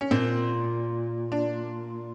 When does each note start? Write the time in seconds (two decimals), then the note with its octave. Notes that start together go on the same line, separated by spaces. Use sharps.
0.01 C#4
0.11 A#2 C4
1.32 D4